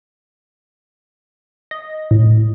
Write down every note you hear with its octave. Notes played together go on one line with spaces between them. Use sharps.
D#5
A2